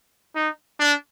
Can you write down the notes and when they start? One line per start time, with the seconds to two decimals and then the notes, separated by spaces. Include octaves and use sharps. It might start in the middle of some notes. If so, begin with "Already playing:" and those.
0.36 D#4
0.80 D4